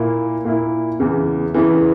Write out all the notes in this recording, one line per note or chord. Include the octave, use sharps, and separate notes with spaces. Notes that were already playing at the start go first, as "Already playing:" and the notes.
Already playing: A#2 A#3 E4
A#2 A#3 E4
E2 C#3 E3
E2 C#3 E3